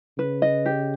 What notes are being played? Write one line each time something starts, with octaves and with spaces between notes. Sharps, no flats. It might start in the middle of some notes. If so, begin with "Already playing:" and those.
C#3 B4
D#5
G4